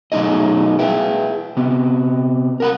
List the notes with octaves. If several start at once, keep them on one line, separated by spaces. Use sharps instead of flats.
B2 F#3 A3 D#4 G#4 D#5
G#4 B4 E5 G5
C3 B3
A#4 F#5 B5